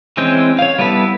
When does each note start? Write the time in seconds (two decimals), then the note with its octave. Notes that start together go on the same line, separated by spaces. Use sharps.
0.17 E3 G#3 C4 C#4 G6
0.59 C#5 F5
0.78 G3 B3 E4 A4 B4